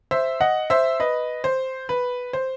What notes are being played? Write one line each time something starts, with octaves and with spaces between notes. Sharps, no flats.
C5 E5
D#5 F#5
C5 E5
B4 D#5
C5
B4
C5